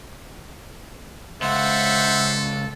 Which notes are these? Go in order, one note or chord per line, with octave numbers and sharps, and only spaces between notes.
C#2 A4 C5 E5 F#5